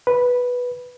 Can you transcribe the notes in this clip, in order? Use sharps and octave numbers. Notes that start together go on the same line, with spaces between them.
B4